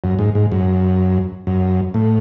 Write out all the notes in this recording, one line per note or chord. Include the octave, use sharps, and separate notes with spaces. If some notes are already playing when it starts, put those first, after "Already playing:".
F#2
G#2
G#2
F#2
F#2
A2